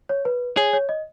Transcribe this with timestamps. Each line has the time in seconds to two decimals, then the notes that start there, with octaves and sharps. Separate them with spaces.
0.09 C#5
0.25 B4
0.57 G#4 C#5
0.73 C#5
0.89 D#5